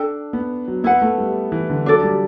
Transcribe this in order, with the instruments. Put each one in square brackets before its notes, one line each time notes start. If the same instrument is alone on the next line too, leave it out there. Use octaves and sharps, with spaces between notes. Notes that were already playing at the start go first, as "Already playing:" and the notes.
Already playing: [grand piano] D4 [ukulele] A4 G5
[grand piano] B3
F#3
[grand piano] B3 [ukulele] E4 B4 F#5
[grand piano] A3
G3
E3
D3
[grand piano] F#3 [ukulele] D4 A4 D5
[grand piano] G3